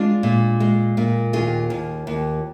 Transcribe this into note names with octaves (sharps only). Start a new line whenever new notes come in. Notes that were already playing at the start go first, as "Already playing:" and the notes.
Already playing: G#3 D4 F4
A#2
G#3
A#2
D#2 F4 G#4
D#2
D#2